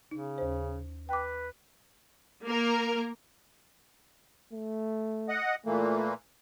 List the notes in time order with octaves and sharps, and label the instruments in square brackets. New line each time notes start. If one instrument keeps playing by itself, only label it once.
[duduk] C#3 [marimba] D#4
[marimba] D#2 C5
[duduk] B4 [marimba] G5 D6
[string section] A#3 A#4
[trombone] A3
[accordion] D#5 F#5
[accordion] A#2 E3 A#3 [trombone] A3